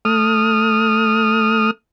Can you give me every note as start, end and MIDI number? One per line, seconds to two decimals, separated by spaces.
0.05 1.71 57
0.05 1.71 87
0.05 1.71 89